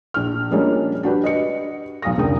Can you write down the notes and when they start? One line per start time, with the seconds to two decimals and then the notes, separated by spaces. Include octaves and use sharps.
0.14 A#1 F6
0.51 F3 G3 G#3 A#3 C#4 D4
1.03 D4 F#4 G4 B4
1.23 D#5 C#7
2.02 B1 F5 D#6 A#6
2.17 F1 C#2 D3 A#4 G5 D#6